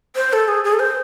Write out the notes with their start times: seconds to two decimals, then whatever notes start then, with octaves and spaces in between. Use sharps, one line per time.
0.16 C5
0.33 A4
0.48 G#4
0.64 G#4
0.73 A4
0.80 C5